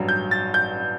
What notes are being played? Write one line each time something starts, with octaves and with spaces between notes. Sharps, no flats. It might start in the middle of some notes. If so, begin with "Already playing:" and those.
Already playing: A1 G2 F#3
G6
A6
G6